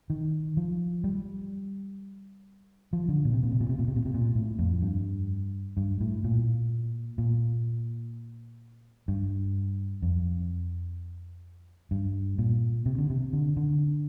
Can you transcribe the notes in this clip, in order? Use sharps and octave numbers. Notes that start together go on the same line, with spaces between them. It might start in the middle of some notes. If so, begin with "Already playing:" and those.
D#3
F3
G3
F3
D3
A#2
C3
A#2
C3
A#2
C3
A#2
C3
A#2
C3
A#2
A2
F2
G2
G2
A2
A#2
A#2
G2
F2
G2
A#2
C3
D3
C3
D3
D3